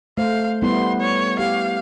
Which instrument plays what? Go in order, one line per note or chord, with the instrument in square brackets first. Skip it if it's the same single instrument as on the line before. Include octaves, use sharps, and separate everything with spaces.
[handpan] A3 C5 [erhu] F5
[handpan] G3 B3 E4 [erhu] C6
[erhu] C#5
[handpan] G4 [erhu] F5